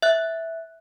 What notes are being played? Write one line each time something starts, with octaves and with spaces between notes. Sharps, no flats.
E5 F#6